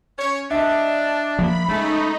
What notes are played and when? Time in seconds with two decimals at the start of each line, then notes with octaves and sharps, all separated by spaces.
0.17 C#4 C#5
0.51 D4 D#5 E5
1.39 F3 A#3 B5
1.69 C#3 G#3 A3 D#4